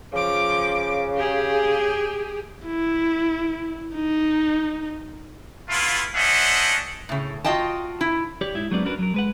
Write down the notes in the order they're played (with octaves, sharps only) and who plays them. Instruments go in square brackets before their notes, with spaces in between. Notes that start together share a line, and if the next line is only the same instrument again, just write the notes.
[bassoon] C#3 [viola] F3 D6
[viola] G4 G#4
[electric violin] E4
D#4
[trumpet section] A3 B3 E4 F4
C#4 D4 C5 D#5 E5 F#5
[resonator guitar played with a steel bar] A2 C#3
F4 F#4 D#5 G5 A5
E4
[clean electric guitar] G4 C#5 D5
G#2 D#4 E4 E5
F#3 G#3 B3 C4 D4 D5
C#4 D4 F#4 A#4 B4
F#3 A#4
G#3 B4 F#5